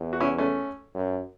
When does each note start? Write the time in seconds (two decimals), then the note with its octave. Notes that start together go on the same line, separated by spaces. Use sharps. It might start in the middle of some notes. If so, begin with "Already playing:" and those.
Already playing: E2
0.13 F#4
0.20 C#4 E4
0.38 A3 C#4
0.94 F#2